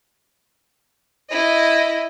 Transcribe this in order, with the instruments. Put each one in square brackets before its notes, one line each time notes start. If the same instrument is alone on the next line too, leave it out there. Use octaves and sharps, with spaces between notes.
[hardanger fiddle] E4 D#5